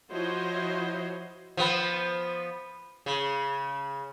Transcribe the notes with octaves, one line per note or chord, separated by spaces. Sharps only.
F3 E4 F#4 C5 C#5 D#5
F3 B3
C#3